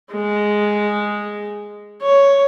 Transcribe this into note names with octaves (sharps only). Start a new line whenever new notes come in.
G#3
C#5